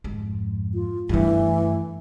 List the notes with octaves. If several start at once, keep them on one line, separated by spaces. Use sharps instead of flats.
F2 G#2
F4
G2 E3 A3